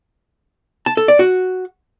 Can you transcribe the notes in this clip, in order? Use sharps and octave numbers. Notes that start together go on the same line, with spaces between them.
A5
A4
D5
F#4